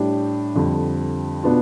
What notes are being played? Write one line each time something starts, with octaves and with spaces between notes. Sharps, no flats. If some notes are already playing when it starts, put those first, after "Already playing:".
Already playing: A2 G3 D4 G4
F2 D3 G3
B2 B3 D4 F4